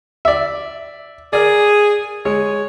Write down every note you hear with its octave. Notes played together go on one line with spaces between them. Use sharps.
D5 E5
G#4 A#4 D5
G#3 C#5